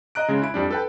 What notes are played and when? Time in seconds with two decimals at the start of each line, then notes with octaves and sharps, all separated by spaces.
0.15 D#5 A#5 F#6 D7
0.28 C#3 G#3
0.42 E4 D7
0.54 F2 G3 D4
0.71 A4 B4 G5